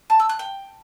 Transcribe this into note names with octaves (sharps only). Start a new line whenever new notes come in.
A5
E6
F#6
G5